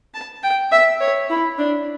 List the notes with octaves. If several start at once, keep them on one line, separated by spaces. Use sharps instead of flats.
A5
G5
E5
C#5
E4
D4